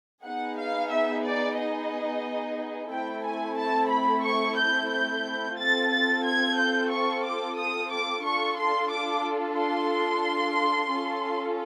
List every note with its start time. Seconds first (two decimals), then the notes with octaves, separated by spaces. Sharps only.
0.24 B3 D#4 G#4 F#5
0.57 F5
0.90 E5
1.24 D5
1.57 D#5
2.91 A3 C4 E4 A4 G5
3.25 G#5
3.57 A5
3.90 B5
4.24 C#6
4.57 G6
4.90 G6
5.57 C4 F4 A4 A6
5.90 A6
6.24 G#6
6.57 G6
6.90 C#6
7.24 D6
7.57 D#6
7.91 D6
8.24 D4 F4 A4 C#6
8.58 C6
8.91 D6
9.58 C6
10.91 C#4 F4 A4